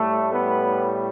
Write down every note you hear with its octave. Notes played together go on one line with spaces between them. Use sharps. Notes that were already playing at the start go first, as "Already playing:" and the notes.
Already playing: A2 G3 A3
B3